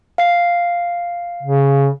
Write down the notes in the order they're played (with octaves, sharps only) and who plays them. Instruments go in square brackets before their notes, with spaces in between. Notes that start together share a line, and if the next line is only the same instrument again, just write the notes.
[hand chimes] F5 C7
[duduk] C#3